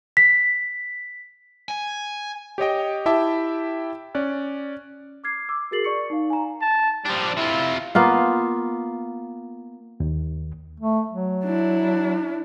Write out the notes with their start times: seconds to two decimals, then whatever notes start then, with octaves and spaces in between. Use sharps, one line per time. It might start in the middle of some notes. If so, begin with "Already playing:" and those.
0.17 B6
1.68 G#5
2.58 G4 C#5 D#5 G5
3.06 E4 G4 E5 G5 A5 D6
4.15 C#4 D5 F#6
5.24 D6 F6 G#6 C7
5.48 D6 E6
5.71 F#4 G#4 A#4 A6 C7 F#7
5.84 D5 C#6 C#7
6.10 D#4 F5
6.30 G#5 A#5
6.61 A5
7.05 F3 G3 D4
7.37 C3 E4 F4
7.95 A#3 B3 F4
10.00 D#2
10.80 A3
11.12 F#3
11.45 D4 E4